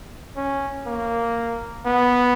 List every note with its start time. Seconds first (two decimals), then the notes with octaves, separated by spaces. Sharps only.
0.37 C#4
0.87 A#3
1.86 B3